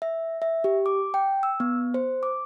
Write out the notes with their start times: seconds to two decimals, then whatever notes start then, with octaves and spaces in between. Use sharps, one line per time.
0.02 E5
0.42 E5
0.64 G4
0.86 D6
1.14 G5
1.43 E6
1.60 B3
1.94 C5
2.23 D6